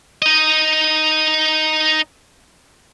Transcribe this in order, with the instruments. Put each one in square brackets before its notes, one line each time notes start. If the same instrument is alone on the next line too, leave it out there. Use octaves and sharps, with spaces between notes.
[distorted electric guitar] D#4 D#5